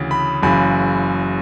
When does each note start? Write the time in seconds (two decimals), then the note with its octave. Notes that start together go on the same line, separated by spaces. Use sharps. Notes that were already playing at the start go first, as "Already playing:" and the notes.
Already playing: D2 C#3 E3
0.11 B5
0.43 F#1 F#2 C#3 E3 B5